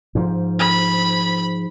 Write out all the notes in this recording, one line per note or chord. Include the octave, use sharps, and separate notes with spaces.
G#2 F3
B5